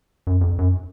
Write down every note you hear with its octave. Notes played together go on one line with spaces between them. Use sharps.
F#2
F2
F#2